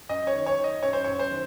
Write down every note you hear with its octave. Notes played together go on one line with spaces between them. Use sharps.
F#2 D#5
C#5
D#3
C#5
D#3
D#5
F#2 C#5
C5
F#2 C#5
C5
D#3